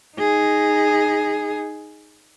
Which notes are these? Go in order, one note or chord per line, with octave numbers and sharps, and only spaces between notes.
D#4 G#4